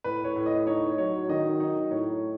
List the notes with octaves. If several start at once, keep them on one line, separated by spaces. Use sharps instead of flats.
A2 B4
C#5
A2
D#5
D#4 C#5
F#3 C#5
D#3 D#5
D#4
A2 C#5